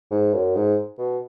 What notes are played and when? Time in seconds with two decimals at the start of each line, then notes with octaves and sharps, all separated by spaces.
0.11 G#2
0.33 F#2
0.55 G#2
0.98 B2